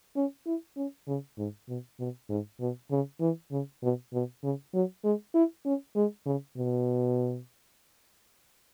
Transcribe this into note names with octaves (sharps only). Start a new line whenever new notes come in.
C#4
E4
C#4
C#3
G#2
B2
B2
G#2
B2
C#3
E3
C#3
B2
B2
C#3
F#3
G#3
E4
C#4
G#3
C#3
B2